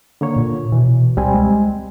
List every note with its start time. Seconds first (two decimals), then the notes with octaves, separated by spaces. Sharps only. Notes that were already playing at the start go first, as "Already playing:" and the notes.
0.21 D3 A#3 C#5
0.36 A#2
0.72 B2 E3
1.17 C#2 G3 C4 G#5
1.34 G#3